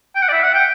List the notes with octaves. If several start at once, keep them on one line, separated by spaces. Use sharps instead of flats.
G5
F#5
D5
E5
F#5
G5